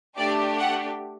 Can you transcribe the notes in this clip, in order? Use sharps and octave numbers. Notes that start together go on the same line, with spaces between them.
A3 D4 G4 D5
F#5